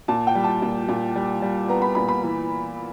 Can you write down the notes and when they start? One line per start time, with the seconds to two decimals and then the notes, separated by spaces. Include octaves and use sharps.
0.08 A#2 A5
0.27 G5
0.35 G3
0.44 A5
0.62 A#2
0.88 A#2
1.16 G3
1.42 G3
1.68 B3 A#5
1.82 B5
1.95 A#2 B5
2.09 B5
2.23 E3